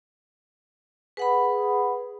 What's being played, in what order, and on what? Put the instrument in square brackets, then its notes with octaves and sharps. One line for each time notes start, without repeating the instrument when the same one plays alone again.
[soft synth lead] G#4 [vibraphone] B4 F#5 B5